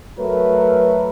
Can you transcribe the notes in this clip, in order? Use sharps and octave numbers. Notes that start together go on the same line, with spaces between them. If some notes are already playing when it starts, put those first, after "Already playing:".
F#3 A3 A#4 B4